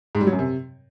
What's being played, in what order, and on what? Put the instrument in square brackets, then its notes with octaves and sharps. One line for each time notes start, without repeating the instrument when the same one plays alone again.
[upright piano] G#2
G3
F#3
F#2
C3